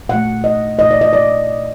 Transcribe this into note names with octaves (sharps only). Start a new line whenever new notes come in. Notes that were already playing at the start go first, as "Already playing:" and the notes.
A#2 A3 F#5
D#5
A#2 A3 D#5
D5
D#5
D5